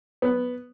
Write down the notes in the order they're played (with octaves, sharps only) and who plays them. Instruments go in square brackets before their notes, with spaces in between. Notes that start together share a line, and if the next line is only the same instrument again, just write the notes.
[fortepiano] B3